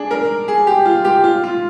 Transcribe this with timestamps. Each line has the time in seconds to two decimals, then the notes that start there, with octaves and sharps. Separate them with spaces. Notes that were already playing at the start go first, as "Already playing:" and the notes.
Already playing: D4 G#4
0.11 A#4
0.48 G#4
0.67 G4
0.85 F4
1.05 G4
1.24 F4
1.44 F4